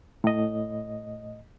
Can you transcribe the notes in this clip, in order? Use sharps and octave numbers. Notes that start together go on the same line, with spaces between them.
A2 D#5